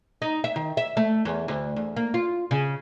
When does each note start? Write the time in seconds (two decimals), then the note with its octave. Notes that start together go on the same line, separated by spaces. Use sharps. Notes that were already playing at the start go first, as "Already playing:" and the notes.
0.22 D#4
0.44 E5
0.56 D#3
0.77 E5
0.97 A3
1.25 E2
1.48 D2
1.76 E2
1.96 A#3
2.14 F4
2.51 C#3